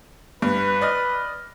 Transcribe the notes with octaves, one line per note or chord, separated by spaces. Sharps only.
G2 B4
D5 D#5 F6